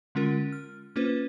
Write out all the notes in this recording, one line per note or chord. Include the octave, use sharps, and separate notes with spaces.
D3 G#3 C#4 F4 A#4
F6
A#3 C#4 F4 B4 C5